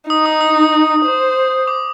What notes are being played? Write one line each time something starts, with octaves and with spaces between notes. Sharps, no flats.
D#4 D#6
D#6
D#6
C5
D6